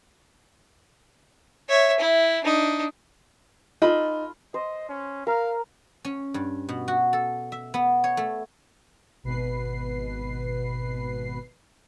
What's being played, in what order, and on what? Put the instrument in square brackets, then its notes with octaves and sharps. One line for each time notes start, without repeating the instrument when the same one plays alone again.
[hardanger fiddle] C#5 E5
E4
D4 D#4
[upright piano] D#4 [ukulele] F4 A4 B5
[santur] C5 [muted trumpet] D#5
[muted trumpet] C#4
[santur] A#4 [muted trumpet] F5
[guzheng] C#4
G2
B2
F#4
A4
E5
B3
C#5
A3
[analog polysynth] G#1 B2 B4 C7